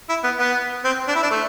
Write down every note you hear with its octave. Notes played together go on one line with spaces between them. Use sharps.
E4
B3
B3
C4
D4
E4
D4
A3